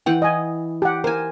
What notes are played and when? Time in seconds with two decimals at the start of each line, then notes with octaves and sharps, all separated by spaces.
0.06 E3 F#5 G5
0.22 D#5 G#5
0.82 G4 F#5
1.04 A#4 C5 G#5